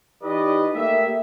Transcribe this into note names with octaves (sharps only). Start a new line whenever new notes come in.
E3 D#4 G4 B4 D5 D#5
A3 A#3 G4 E5